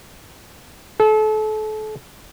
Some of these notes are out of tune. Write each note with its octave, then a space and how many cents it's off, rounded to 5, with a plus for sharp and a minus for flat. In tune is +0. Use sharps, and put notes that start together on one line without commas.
A4 -30